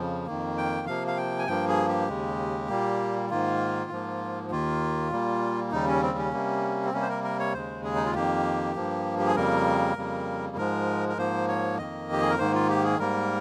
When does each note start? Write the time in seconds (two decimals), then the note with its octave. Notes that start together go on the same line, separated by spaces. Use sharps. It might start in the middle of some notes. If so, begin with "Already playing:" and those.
Already playing: F2 C#3 F3
0.27 F2 D#3 A#3
0.57 G5
0.87 C3 F3 A#3 F5
1.07 F5
1.17 G5
1.39 G#5
1.47 G2 F3 A#3 G5
1.68 G#4
1.88 G4
2.08 D#2 C#3 G#3
2.69 A#2 G3 A#3
3.30 G#2 D#3 A#3 F4
3.90 G#2 F3 A#3
4.50 D#2 D#3 A#3 F4
5.11 A#2 G3 A#3
5.72 D#2 C#3 G3 D#4
5.88 C#4
6.03 C4
6.18 C#4
6.33 C3 G3 A#3
6.85 C4
6.93 C3 G3 A#3 C#4
7.02 C5
7.09 A#4
7.24 A#4
7.39 C#5
7.54 D#2 C#3 G#3 C5
7.84 G#4
7.96 D#4
8.06 F4
8.15 F2 D#3 A#3 G4
8.75 G2 F3 A#3
9.19 G4
9.27 G#4
9.35 F2 C#3 G3 A#3 A#4
9.97 F2 C#3 G3 A#3
10.57 G#2 F3 G#3 A#4
11.09 A#4
11.18 G#2 F3 A#3 C5
11.48 C#5
11.78 F2 D#3 A#3 D#5
12.12 G4
12.22 G#4
12.30 A#4
12.39 G#2 D#3 A#3 C5
12.54 F4
12.70 G4
12.84 G#4
12.99 G#2 G3 A#3 A#4